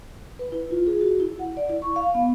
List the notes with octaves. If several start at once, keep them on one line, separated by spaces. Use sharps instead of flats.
B4
E4
F4
G#4
F#4
E4
F#5
D5
E4
C#6
F5
B3